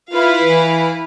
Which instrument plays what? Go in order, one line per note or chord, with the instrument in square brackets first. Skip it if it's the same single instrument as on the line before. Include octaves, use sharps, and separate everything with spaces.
[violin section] E4 B4 F5 [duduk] F4
[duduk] E3